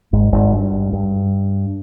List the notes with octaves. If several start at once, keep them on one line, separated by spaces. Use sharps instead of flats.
G#1 G#2
G#1 G#2
G2
G2